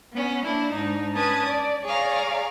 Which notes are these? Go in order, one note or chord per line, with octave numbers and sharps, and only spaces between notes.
B3 C#4
A#3 D4 E4
G#2 D4 D#4
C#4 B4 A5 D#6 G#6
D5
G#4 C#5 D5 F5 A#5